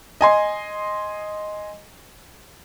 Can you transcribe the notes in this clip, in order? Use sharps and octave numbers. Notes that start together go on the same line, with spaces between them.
D#5 G#5 C6